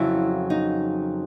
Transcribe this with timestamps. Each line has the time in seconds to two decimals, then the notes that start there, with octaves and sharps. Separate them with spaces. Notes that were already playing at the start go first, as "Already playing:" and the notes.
Already playing: F2 C#3 F#3 E4
0.50 D#4